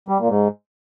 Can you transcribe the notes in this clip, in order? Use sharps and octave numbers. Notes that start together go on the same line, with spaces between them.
G3
A#2
G#2